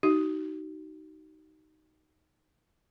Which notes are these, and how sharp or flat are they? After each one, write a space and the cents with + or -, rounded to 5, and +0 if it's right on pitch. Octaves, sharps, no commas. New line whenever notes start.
D#4 +0 F#4 +45